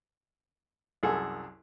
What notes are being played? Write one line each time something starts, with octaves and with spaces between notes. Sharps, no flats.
C2 F#2 G#4 A4